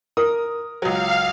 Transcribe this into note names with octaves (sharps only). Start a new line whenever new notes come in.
A#4 D#6
C#2 F#3 F5